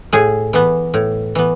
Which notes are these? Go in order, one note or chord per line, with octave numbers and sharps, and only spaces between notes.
A2 G#4
E3 B3
A2
E3 B3